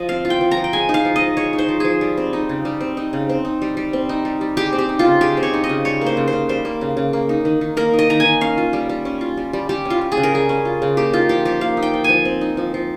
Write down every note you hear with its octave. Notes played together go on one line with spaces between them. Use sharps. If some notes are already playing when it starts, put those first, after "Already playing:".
Already playing: F3 D#5
C4 F5
F4
G5
F3
A#5
F3
G5
G#3 G#5
D#4
F5
F3
D#5
F3
G#3 C#5
D#4
C5
F3
F3 G#4
G3
C4
D#4
C#3
G3
C4
D#4
C#3
C4
D#4
G3
G3
C4
D#4
G3
G3
G#3 G4
C4
G4
D#4
F4
C#3
G#3 G4
C4
C#5
D#4
D#5
C#3
G3 C#5
A#3
C5
C#3
C5
C#3
G3 C5
A#3
C#3
C#3
A#3
D#4
D#3
D#3
A#3 A#4
D#4
D#5
D#3 A#5
G#5
D#3
C#4 F5
F4
G3
G3
C#4
F4
G3
G3
G3 G4
C#4
F4
F4
G#4
C#3
A#4
G3 G#4
C#4
F4
C#3
A#3 G4
D#4 F4
F3 G4
F3 G4
A#3 F5
D#4
G5
F3
F3 G#5
C4
D#4
F3
F3